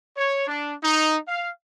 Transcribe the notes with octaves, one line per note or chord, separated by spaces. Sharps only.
C#5
D4
D#4
F5